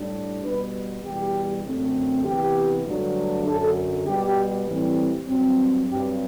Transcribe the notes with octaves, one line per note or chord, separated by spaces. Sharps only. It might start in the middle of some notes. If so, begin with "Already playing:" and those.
Already playing: A2 G3 D4
B2 G3 B3 B4
E2 B2 G3 G4
F#2 D3 A3 C4
C3 E3 B3 G4
G2 D3 F#3 A3 D4
F#2 D3 F#3 A4
B2 G3 B3 G4
A2 E3 G3 C4
G2 F#3 C4
G2 F#3 C4 G4